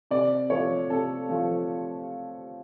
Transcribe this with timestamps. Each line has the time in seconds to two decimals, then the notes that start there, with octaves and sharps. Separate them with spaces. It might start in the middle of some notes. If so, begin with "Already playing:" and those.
0.11 C3 D5
0.50 F3 A3 C#5
0.90 C3 A4
1.29 F3 A3